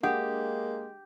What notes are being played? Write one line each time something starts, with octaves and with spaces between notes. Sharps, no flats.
G#3 A#3 D4 G4 F#5 D#6